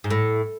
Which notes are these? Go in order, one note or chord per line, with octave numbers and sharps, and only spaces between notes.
G#2
A2